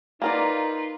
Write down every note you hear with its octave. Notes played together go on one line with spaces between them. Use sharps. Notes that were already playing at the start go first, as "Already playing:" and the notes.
A#3 D#4 F4 A#4 B4 D5